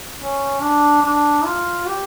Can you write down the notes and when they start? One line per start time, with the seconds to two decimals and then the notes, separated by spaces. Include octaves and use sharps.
0.19 C#4
0.60 D4
1.02 D4
1.45 F4
1.88 G4